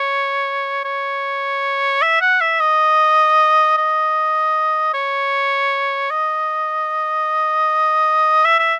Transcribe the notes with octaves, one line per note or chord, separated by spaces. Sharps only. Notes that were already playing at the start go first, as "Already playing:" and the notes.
Already playing: C#5
C#5
E5
F#5
E5
D#5
D#5
C#5
D#5
E5
E5